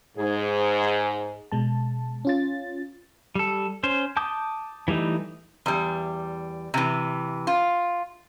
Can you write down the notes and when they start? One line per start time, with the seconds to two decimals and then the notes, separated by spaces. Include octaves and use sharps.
0.18 G#2 G#4
1.52 B2 G#3 A5
2.25 C#4 F4 A6
3.35 G3 A4
3.83 C#4 C5
4.17 A5 D6 D#6 G6
4.88 E3 G3 A3 D#4
5.66 E2 G3
6.74 C3 E3
7.47 F4